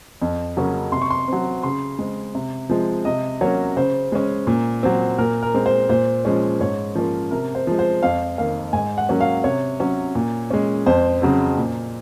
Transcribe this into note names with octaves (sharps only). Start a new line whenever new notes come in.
F2
C#3 F#3 A#3 C#4
C3 C6
C#6
C6
F#3 C4
C#3 C6
G#3 C4
C3
F3 G#3 C4
C3 D#5
F#3 A#3 C#4 C#5
C#3 C5
G#3 C#4
A#2
F#3 C4
A#2 A#4
A#4
G#3 C4
C5
A#2 C5
F3 G#3 C#4
G#2 C#5
F3 A#3 C#4
C3 A#4
C5
F3 G#3
C5
F2 F5
D#3 A#3 F5
G#2 G#5
F#5
F#3 A#3 C#4
F5
C3 C#5
F#3 C#4
A#2
G#3 C#4
F2 C5
C#3 F#3 C4
A#2